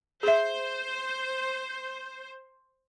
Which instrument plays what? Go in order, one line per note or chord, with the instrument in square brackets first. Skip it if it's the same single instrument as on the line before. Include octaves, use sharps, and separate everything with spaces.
[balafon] G#4 E5 [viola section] C5